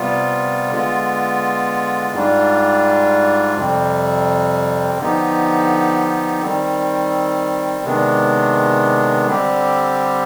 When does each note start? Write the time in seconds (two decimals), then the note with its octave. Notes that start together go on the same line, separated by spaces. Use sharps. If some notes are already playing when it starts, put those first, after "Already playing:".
Already playing: C3 G3 B3 F4
0.71 D3 G#3 B3 F4
2.14 G#2 G3 D4 F4
3.56 F2 C3 G3 C4
4.98 D3 F3 B3 D#4 G4
6.41 D#3 G3 C4
7.84 C3 D#3 G#3 B3 D4
9.26 D3 G3 C4 G4